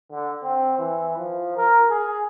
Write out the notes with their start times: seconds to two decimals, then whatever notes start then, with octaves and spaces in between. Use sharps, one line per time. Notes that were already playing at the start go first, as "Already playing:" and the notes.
0.11 D3
0.43 C4
0.79 E3
1.17 F3
1.56 A#4
1.89 G#4